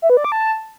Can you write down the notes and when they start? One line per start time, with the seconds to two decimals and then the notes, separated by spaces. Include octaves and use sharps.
0.02 E5
0.10 B4
0.17 D5
0.24 D6
0.32 A5